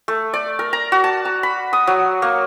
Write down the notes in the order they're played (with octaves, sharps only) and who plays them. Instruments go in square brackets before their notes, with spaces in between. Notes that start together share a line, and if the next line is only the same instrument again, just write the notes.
[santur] A3
D5
A#4
A#5
F#4
A5
A#5
B5
D#6
F#3
A#3